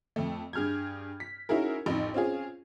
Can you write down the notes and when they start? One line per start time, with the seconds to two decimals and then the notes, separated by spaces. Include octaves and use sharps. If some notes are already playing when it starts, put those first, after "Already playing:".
0.16 F2 A3
0.53 G2 G#4 F6 G6 G#6
1.20 B6
1.49 C#4 D#4 E4 F#4 G#4 A#4
1.86 A1 F2 D#4
2.14 C4 C#4 F4 G#4